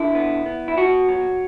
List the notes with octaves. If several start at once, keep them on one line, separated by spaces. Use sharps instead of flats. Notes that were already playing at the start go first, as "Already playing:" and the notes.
Already playing: D3 E4
B3
B3
E4
B2 F#4
F#3